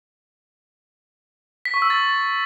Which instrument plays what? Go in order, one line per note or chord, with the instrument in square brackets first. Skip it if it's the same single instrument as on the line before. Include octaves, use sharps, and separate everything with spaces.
[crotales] B6
C#6
E6
A6